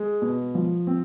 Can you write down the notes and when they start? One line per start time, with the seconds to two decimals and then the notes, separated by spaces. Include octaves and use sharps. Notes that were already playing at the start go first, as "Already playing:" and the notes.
Already playing: G#3
0.22 B2
0.55 F3
0.87 C4